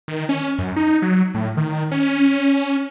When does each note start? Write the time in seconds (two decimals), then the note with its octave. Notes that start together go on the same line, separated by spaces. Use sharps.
0.08 D#3
0.29 C#4
0.59 F#2
0.76 D#4
1.02 F#3
1.34 A2
1.57 D#3
1.91 C#4